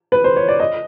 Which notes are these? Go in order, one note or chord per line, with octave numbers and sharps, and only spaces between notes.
B4
C5
C#5
D5
D#5